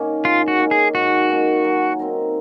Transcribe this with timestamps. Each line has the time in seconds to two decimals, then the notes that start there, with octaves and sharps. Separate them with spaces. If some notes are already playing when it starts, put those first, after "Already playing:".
Already playing: D#3 A#3 C#4
0.24 G#2 F4
0.48 F#4
0.60 D#3 A#3 C#4
0.71 G#4
0.95 G#2 F#4
1.30 D#3 A#3 C#4
1.64 F#3
1.99 C4 D#4 A#4